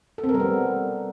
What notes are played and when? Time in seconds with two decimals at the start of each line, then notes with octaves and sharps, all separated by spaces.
0.18 A4
0.24 C4
0.29 A#4
0.34 G3
0.40 B3